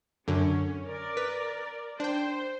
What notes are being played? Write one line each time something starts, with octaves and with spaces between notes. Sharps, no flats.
F#2 D3 C#4
A#4 D5
B4
D4 C5 G5